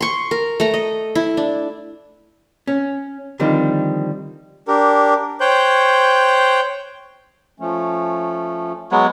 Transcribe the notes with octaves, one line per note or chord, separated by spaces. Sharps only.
C6 C#6
A#4
A3 A#5
D#5
E4
D4
C#4
D3 D#3 F3 G3 C4
D4 G4 A#4
C5 C#5 G5 F#6 G6
F3 A3 C#4
F#3 G#3 B3